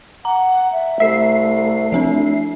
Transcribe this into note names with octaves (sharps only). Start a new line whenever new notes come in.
F#5 A#5
E5
C2 A3 E5 C7
F3 C4 D4